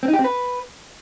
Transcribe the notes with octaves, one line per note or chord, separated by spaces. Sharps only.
C4
D#4
G4
C4
B4